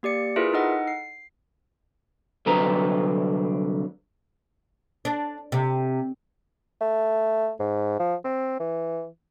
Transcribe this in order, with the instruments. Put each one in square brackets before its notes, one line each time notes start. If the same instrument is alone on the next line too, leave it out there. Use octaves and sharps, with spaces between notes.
[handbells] A#3 G4 D5 C#7
E4 F4 G#4 A#4 B4 E5
D#4 A4 D#5 F#5
C7
[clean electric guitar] C2 D3 F#3 C4 B4 A#5
[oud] D4
C3
[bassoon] A3
G#2
F3
C4
E3